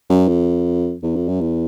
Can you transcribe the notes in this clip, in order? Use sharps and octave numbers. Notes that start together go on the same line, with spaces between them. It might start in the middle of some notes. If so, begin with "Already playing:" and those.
F#2
F2
E2
F2
F#2
E2